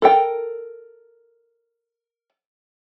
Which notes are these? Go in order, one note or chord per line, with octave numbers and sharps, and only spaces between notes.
A4 A#4 G5